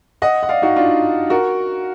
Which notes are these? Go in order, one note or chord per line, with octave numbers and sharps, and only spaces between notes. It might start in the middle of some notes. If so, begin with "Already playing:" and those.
D#5 F#5
F#5
D5 F5
D#4 F#4
D4 F4
F#4 A#4